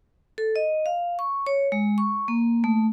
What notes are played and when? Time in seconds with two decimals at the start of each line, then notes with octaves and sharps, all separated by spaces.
0.38 A4
0.56 D#5
0.86 F5
1.19 C#6
1.47 C#5
1.72 G#3
1.98 C#6
2.28 A#3
2.64 A3